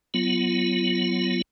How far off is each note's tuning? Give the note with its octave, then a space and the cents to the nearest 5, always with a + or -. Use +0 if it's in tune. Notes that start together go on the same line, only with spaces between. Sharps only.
F#3 +0 B3 +0 F4 -30